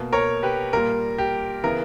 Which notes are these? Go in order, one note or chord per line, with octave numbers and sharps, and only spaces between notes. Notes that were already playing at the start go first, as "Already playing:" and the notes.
Already playing: B2 A#3
A#4 C#5
G4 B4
A#2 G3 A#3 A#4
G4
C#3 E3 B3 A#4